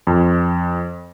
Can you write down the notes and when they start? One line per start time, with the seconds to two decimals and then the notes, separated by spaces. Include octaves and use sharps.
0.07 F2